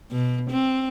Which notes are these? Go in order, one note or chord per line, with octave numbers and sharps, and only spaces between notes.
B2
C4